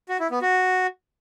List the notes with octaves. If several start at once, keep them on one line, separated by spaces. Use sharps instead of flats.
F#4
E4
B3
F#4